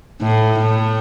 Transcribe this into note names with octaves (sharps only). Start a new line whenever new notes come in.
A2
A2